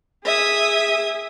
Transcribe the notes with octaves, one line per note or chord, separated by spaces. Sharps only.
G#4 E5 D#6